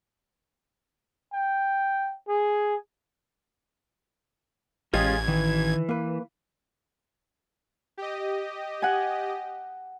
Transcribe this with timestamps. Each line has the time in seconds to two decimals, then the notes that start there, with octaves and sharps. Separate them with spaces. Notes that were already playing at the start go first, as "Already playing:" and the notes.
1.33 G5
2.29 G#4
4.94 A1 G#3 C#4 F4 G4 G#4 D#5 G#6
5.28 D#3 E3
5.89 A#3 B4
7.97 G4 D#5
8.82 F#5 G#5